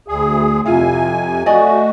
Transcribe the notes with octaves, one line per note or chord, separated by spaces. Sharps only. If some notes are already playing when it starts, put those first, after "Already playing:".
D2 G#4
F2 C3 E4 F4 G#5
A3 F#4 D5 D#5 G#5